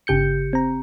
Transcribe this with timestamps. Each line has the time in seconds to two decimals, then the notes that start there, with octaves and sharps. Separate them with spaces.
0.07 G1 C#3 G4 G6 C#7
0.53 C4 A#5